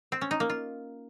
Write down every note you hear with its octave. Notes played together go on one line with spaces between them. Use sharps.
C4
C#4
D#4
A#3
F4